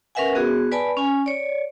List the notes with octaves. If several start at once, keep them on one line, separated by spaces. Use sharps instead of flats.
C#4 A#4 B4 E5 F#5 G#5
B3 F#4 G#4
B4 D5 G#5 A5 B5
C#4 G#5
C#5 D5